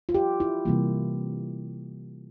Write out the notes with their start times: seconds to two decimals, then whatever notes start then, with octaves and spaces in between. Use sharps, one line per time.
0.09 F4
0.15 G4
0.40 E4
0.65 C3 E3 G3 A#3